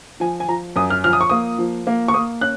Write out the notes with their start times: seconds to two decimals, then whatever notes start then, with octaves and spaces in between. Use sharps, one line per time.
0.20 F3 G#5
0.40 G#5
0.48 F3 A#5
0.76 F#2 D#6
0.90 F6
1.04 F3 F6
1.13 D#6
1.21 C#6
1.30 A#3 D#6
1.58 F3
1.87 A#3
2.08 C#6
2.14 A#3 D#6
2.41 C#4 F#6